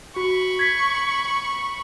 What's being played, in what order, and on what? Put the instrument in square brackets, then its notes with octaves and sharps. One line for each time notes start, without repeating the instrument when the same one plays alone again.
[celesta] F#4 [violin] B5 C#6
[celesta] G#6 B6